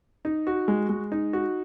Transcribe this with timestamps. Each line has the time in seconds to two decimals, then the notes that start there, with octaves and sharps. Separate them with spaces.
0.25 D#4
0.47 F#4
0.68 G#3
0.89 G#3
1.12 D#4
1.33 F#4